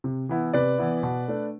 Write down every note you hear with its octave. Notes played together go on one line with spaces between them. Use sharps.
C3
E3 B3 E4
C3 B4 D5
E3 B3 E4
B2
A3 D4